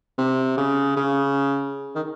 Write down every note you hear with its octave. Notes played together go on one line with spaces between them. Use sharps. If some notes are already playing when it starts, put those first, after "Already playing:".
C3
C#3
C#3
D#3